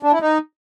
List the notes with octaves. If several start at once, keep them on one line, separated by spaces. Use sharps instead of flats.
D4
E4
D#4